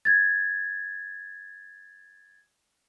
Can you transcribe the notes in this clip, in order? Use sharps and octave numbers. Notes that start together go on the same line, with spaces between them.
G#6 A6